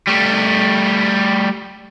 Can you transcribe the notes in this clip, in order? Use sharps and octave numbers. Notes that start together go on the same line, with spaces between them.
G3 A3